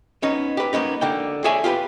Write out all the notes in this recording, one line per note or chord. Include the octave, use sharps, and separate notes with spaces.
B3 C#4 D#4
G4 B4
A#3 B3 C#4 D#4
D3 A#3 G5
G#4 A4 C#5 D5 E5 G#5
F4 G4 A#4 B4